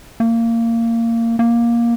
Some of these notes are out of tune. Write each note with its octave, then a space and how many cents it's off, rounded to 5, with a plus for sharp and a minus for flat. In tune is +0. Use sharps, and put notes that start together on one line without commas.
A#3 -20
A#3 +10